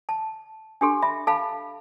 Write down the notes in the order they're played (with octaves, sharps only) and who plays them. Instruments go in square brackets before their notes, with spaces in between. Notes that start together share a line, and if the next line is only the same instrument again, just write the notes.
[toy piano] A5
[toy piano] D4 G4 A4 [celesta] G#5 C6
[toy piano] E5 [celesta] B5
[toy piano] A4 F5 B5 [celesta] A5